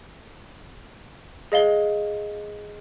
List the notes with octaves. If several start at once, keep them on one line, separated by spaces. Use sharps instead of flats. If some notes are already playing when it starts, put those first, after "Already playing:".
G#4 D#5 F5 G7